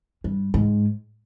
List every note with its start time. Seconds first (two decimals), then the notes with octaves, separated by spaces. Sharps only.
0.24 G2
0.54 G#2